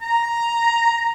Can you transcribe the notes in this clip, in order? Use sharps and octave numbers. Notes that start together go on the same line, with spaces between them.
A#5